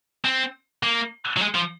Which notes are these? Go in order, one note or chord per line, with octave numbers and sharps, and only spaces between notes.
C4
A#3
F#3
G#3
F3